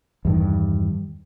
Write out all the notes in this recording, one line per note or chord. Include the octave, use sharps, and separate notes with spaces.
E2 G2 D#3